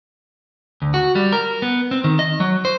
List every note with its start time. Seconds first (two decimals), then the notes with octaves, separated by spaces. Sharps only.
0.82 D2
0.94 F#4
1.15 G3
1.32 A#4
1.62 B3
1.91 C4
2.04 D#3
2.19 D#5
2.40 F#3
2.65 C5